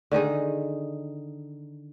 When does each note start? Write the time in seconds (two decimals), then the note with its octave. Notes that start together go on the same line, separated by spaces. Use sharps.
0.11 D3 D#3 D#4 G#4